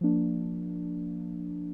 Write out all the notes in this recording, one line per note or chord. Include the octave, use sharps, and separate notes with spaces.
F3 A#3 D4